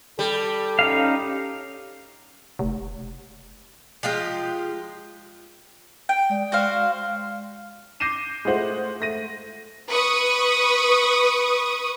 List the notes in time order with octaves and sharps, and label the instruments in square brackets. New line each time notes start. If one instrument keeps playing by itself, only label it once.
[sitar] G3 [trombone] A4
[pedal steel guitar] C#4 D#4 F5
[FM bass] F1
[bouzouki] F3 G#3 F4 G4
[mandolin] G5
[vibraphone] G#3 D5
[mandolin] F#4 C5 F5
[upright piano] D6 G6 A#6 C7 D#7 E7
G#3 A3 F4 C5 F#5
A3 A#6 D#7
[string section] B4 C#6 D#6